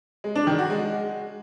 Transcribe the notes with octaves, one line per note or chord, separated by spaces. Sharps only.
G#3
D4
D#3
F#4
G#3